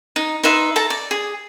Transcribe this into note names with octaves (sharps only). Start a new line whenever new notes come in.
D#4
D#4 B4 E5 C6
A4 A5 A#5
D5
G#4